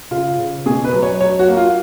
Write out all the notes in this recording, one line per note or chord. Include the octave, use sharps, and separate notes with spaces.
C#3 F4
C#3
B2 G#4
B4
F#3
C#5
F#3 C#5
F#4
A#3
F4